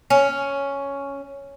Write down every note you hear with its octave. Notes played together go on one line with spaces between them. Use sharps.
C#4